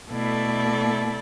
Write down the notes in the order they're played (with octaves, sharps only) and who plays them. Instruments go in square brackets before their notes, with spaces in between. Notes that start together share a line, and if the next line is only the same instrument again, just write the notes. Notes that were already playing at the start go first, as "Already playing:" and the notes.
[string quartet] B2 A3 E4 A4 D5